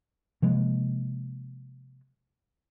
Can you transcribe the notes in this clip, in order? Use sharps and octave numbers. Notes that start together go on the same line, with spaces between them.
C3 F3 G#3 A#3